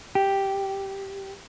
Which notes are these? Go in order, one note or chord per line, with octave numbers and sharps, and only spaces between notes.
G4